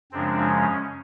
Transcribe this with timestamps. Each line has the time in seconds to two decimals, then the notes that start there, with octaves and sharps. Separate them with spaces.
0.12 F#2 C#3 F3 G#3 C4 D4
0.46 C#4